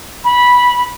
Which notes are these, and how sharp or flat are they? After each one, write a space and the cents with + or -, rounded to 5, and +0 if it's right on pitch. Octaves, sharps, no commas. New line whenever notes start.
B5 -10